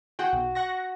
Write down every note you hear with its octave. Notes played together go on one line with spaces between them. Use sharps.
F#4 G#4 F#5 G5
B1
F#5 C#6 A#6